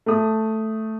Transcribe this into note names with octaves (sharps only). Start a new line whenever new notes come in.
A3 D#6